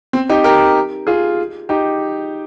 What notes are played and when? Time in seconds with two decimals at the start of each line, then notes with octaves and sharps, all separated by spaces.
0.13 C4
0.29 D#4 G4
0.44 G4 A#4
1.07 F4 G#4
1.69 D#4 G4